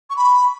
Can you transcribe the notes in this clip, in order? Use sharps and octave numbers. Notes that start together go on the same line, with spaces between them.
C#6
B5